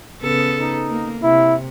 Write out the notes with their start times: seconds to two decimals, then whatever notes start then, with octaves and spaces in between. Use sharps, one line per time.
0.22 C#3 B3 A4
0.58 D#4
0.90 A#3
1.23 C3 E4